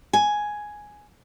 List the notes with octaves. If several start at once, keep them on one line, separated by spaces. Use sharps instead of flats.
G#5